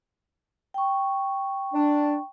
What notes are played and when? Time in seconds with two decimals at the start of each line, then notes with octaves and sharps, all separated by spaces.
0.74 G5 C#6
1.73 D4